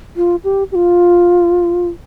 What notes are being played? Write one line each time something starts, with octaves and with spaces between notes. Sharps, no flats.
F4
G4
G4
F4